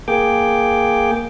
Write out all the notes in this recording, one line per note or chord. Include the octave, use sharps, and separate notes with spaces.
A#3 G#4 G5 D6